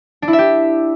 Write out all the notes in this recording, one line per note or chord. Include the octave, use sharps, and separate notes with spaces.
D4
E4
E5
G4